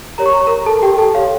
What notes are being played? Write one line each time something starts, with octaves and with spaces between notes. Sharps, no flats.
G4 A#4 C#5 A#5
C#6
A#5
C#6
A#4 A#5
A4 A5
G4 G5
A4 A5
G4 C#5 F5